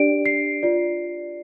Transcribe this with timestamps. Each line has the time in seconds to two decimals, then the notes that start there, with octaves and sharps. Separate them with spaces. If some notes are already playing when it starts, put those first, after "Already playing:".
Already playing: D4 G4 D5 D7
0.26 C7
0.63 F4 D5